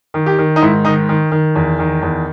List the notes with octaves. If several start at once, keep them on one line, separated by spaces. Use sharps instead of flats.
D#3
G4
D#3
D#4
G#2 E4
D#3 D#4
D#3
D#3
E2
D#3
E2